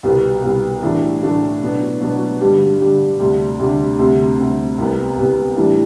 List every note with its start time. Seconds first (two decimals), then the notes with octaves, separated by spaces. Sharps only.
0.03 C2 B2 G3 B3
0.43 C2 B2 G3 B3
0.82 A2 E3 A3 D4 F#4
1.22 A2 E3 A3 D4 F#4
1.61 B2 F#3 B3 D4 F#4
2.01 B2 F#3 B3 D4 F#4
2.41 G2 D3 G3 D4 G4
2.80 G2 D3 G3 D4 G4
3.20 D2 C3 G3 D4 G4
3.59 D2 C3 G3 D4 G4
3.99 D2 C3 G3 C4
4.38 D2 C3 G3 C4
4.78 C2 C3 G3 B3
5.17 C2 C3 G3 B3
5.57 A2 E3 G3 D4